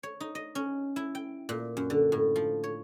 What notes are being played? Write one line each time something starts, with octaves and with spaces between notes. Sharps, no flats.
C#5
D#4
D#5
C#4
E4
G5
A#2
F#2
D3
A2
F3
C#5